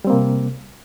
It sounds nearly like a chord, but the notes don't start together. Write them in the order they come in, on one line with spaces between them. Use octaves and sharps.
G3 C4 A#3 C3